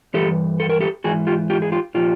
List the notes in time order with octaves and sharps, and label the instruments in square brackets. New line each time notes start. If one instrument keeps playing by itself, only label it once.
[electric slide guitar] G2 E3 G4 A4
A4
A#4
G4 A4
G#2 E3 F#4 G#4
F4 G4
F4 G4
G#4
F4 G4
A#2 F3 F4 G4